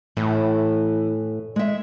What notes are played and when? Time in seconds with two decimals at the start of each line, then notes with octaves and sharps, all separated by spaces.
0.17 A2 E3
1.56 G#3 E5